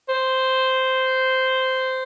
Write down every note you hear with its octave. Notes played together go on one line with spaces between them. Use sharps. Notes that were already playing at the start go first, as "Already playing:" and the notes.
C5